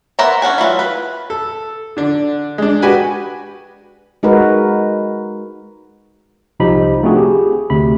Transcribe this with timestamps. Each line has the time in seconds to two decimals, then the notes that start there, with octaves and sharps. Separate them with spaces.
0.19 B3 A#4 C5 E5 A#5
0.42 C#4 D4 F#5 G#5
0.58 E3 F#3 E4 F4
0.79 B4
1.30 A4
1.97 D3 D4
2.58 G#3 D4
2.82 F#4 G4 B4 G#5
4.23 G#3 D#4 F#4 A#4 B4
6.60 C2 C3 F3 D#4 G4 B5
7.03 A3 C4 D4 F4 F#4 G#4
7.17 G4 G#4
7.70 D2 C3 B5